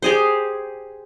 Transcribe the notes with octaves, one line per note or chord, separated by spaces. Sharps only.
G4 G#4 C5